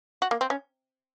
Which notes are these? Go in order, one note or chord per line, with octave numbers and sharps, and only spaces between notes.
F#4
A#3
C4
C#4